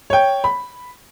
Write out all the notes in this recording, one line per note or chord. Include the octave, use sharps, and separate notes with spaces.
C#5 G5
B5